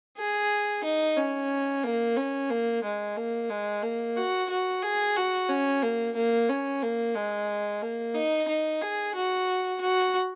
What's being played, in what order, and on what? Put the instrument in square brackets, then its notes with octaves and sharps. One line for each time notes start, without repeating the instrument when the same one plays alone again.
[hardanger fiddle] G#4
D#4
C#4
A#3
C#4
A#3
G#3
A#3
G#3
A#3
F#4
F#4
G#4
F#4
C#4
A#3
A#3
C#4
A#3
G#3
A#3
D#4
D#4
G#4
F#4
F#4